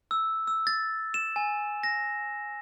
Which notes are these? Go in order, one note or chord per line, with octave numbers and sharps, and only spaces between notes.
E6
E6
A6
E7
G#5
A#6